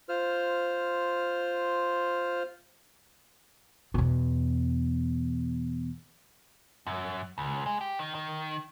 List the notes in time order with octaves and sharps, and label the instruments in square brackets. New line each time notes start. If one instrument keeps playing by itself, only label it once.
[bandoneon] F4 C5 F6
[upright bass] E2 B2
[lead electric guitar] F#2
C#2
G#3
G4
D#3
D#3